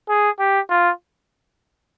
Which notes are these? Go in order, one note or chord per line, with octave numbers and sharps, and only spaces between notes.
G#4
G4
F4